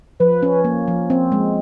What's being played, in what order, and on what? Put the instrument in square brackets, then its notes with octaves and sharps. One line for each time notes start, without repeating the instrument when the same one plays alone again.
[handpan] F3 [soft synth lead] B4
[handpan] C#4
A#3
F3
C4
G#3